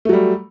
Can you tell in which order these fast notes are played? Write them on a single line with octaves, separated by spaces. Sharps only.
A3 F#3 G3